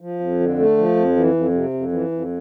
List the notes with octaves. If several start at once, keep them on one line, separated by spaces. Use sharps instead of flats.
F3
F2
D3
A3
F3
F2
E3
F2
C3
F2
E3
F2